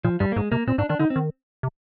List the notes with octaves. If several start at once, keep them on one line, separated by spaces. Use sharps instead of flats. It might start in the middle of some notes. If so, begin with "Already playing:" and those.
A#2 F3
G2 G3
A#3
G#2 G#3
C3 A#3
A#2 C4
G#2 D4
D#3 D4
D3 D#4
C4
D#3
C3